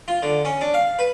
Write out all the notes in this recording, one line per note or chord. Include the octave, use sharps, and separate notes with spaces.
F4
D3
C#4
D4
F5
B4